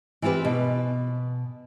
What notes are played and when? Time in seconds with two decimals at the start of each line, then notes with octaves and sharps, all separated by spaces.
0.22 E3 C4 F4 G4 B4
0.45 B2